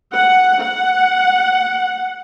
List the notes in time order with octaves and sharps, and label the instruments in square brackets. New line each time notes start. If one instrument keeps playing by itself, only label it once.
[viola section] F#5
F#5